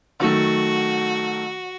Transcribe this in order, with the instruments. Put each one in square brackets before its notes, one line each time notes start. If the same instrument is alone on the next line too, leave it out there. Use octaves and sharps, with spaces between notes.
[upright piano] D#3 F#3 A3 [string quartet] F#4